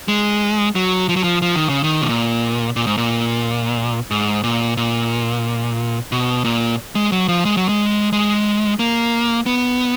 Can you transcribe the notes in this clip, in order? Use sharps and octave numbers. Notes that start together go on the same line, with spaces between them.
G#3
F#3
F3
F#3
F3
F3
D#3
C#3
D#3
B2
A#2
A#2
G#2
A#2
G#2
A#2
A#2
B2
A#2
G#3
F#3
F3
G#3
F#3
G#3
G#3
A#3
B3